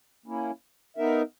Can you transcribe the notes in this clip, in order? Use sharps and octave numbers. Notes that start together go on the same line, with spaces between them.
A#3 C#4 E4
B3 D#4 A#4 E5